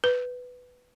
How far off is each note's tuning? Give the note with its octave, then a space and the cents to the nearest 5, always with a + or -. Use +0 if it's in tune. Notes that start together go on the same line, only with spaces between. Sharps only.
B4 +5